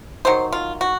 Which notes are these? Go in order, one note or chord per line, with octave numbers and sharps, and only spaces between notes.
D#3 F#3 C5
F4
F#4